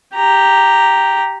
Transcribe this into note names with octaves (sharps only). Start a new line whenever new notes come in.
G4 A#5